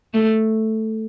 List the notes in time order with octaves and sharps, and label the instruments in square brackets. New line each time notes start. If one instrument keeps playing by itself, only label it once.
[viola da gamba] A3